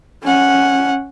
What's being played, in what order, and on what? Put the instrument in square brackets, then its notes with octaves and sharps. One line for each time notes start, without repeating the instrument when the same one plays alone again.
[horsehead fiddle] C#4 F#5